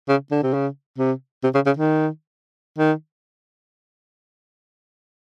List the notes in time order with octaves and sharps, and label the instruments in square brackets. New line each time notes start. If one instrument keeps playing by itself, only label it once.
[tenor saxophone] C#3
D3
C3
C#3
C3
C3
C#3
C#3
D#3
D#3